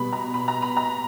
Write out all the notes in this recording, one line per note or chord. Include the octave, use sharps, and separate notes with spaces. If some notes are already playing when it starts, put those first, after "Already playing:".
Already playing: B2 G3 B3 B5
A#5
B5
A#5
B5
A#5